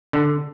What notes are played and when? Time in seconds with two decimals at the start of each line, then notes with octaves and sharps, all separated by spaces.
0.13 D3